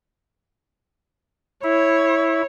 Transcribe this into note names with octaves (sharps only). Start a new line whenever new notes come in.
E4 C#5